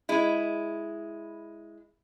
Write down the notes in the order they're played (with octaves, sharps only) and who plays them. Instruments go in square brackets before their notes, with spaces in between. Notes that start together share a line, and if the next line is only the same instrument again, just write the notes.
[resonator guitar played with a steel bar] G#3 E4